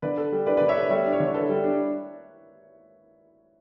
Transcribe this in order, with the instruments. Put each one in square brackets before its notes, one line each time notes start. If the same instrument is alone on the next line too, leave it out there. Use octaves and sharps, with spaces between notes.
[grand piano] D3 [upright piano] B4 D5
[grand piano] A4
G3
[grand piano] D4 [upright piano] B4 D5
[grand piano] D3 [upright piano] B4 D5
[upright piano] C#5 E5
[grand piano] A4 [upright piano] B4 D5
[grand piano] G3 [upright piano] C#5 E5
[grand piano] D4
[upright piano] C#5
[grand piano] D3
[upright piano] C#5
[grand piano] A4 [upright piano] B4
[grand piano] G3
D4